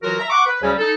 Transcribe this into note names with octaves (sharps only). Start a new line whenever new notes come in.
E3 F#3 F4 F#4 A#4
E5 A#5
F#5 C#6 D6
B4
D2 C#3 F#3 G3 C#4 G#5
D#4 A4